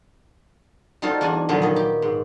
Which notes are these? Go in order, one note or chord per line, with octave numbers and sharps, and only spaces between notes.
G3 D#4 F4 F#4 A4 C5
E2 D4 F#5 G#5
A#2 D3 D#3 F3 F#3 B3
D#3 D#5
G4
G#2